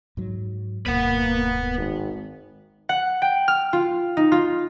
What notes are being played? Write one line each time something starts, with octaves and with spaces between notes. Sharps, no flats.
G#2 F#3
D1 G2 B2 A#3 B4 F#5
G#1
F#5
G5
F6
F4
D#4
F4